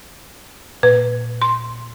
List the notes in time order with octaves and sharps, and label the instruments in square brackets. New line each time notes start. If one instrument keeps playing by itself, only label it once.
[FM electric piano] A#2 [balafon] B4
[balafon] C6